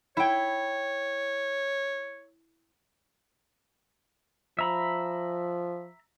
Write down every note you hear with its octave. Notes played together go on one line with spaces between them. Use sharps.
E4 C#5 G5
F3 E5 A#5 B5